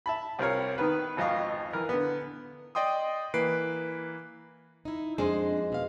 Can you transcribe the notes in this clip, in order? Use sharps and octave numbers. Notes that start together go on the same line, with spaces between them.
E5 A5 B5
C2 C4 F4 A#4 C#5
D#3 B3 B4
G#1 F2 D#5 F5 C#6
E3 A#4 B4
D3 B3
D5 D#5 G5 C6 D#6
E3 A#3 B4 C7 D7
D#4 E4
F2 G#3 D4 C5
B2 F5